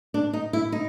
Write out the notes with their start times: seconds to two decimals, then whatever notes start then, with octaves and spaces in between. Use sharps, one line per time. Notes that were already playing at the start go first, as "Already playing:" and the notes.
0.14 D4
0.33 D#4
0.53 E4
0.72 D#4